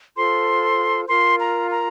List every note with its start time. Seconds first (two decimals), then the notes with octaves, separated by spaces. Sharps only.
0.16 F4 A4 C5 C6
1.08 F4 A#4 C6
1.39 A#5
1.70 A#5